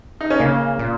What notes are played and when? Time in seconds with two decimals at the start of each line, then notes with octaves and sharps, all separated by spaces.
0.21 D#4
0.30 C#4
0.40 C#3 A#3
0.79 A#2